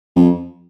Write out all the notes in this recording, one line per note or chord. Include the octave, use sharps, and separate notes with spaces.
F2